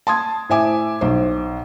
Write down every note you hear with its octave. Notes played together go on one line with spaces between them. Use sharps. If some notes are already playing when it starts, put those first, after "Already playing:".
A5 C6 D#6 G#6
A2 C5 E5 G#5 D6
B1 C5